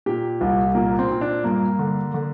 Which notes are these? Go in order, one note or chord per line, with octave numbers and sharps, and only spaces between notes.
A#2 G4
C2
A#2 A#3
C4
A#2
D4
G2 A#3
D3
D3